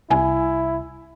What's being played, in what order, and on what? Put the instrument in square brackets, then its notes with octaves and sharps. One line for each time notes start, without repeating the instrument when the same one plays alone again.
[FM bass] C2 [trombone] E4 [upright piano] G#5